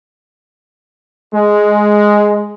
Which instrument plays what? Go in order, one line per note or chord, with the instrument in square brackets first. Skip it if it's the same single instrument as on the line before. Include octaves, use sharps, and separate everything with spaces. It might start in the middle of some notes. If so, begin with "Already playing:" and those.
[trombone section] G#3